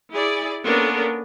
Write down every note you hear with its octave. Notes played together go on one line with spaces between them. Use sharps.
E4 G#4 D5
A#3 B3 C#4 D4 A4 A#4